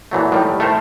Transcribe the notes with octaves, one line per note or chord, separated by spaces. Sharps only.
A#2 E3 F#3 A3
A2 D#3 G3
A3 E4 A4 A#4 C5